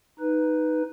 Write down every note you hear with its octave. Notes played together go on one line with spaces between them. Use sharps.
D#4 B4